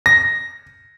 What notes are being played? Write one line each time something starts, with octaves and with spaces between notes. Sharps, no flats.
A#6